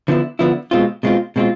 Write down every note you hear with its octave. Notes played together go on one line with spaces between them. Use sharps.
D3 F3 B3 E4
D3 F3 B3 E4
B2 G#3 C4 F4
B2 G#3 C4 F4
B2 G#3 C4 F4